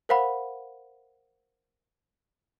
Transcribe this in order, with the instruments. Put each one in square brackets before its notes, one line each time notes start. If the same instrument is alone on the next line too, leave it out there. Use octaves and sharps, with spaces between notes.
[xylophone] A#4 C5 F5 F#5 B5